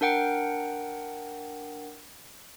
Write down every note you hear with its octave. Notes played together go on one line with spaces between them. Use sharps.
D4 A#4 F#5 G5